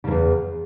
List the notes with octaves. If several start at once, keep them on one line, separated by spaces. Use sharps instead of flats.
E2 G#2 C#3